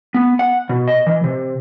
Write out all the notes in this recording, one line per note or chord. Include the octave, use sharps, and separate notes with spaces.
B3
F#5
B2
D#5
E3
C3